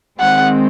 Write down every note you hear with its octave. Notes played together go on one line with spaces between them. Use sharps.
D#3 G#3 C4 F#5